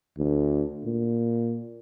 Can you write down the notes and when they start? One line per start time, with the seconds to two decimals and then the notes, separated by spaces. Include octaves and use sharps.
0.18 D2
0.85 A#2